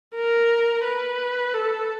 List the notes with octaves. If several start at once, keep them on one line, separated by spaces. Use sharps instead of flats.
A#4
B4
A4